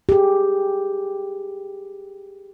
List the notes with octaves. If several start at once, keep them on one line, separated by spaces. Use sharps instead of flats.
G4 G#4